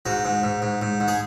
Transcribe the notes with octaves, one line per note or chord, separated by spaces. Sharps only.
G#2 F#4
G#2
G#2
G#2
G#2
G#2
G#4